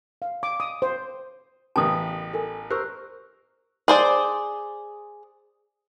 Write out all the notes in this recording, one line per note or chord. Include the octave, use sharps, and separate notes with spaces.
F5
D6
D#6
C5
A1 C#3 B3 A#4 G5 A5 D#6
A4 A#4 G#5
A#4 C5 C#6 E6 F#6
G#4 C5 D5